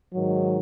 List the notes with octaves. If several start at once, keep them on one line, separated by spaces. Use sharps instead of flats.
G#2 D#3 F#3